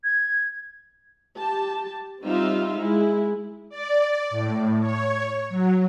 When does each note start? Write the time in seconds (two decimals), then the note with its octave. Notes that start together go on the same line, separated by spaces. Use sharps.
0.04 G#6
1.37 G4 A5
2.24 G3 C4 D#4 F4 E5 F5
2.77 G#3 E4
3.69 D5
4.30 A2
4.79 C#5
5.49 F#3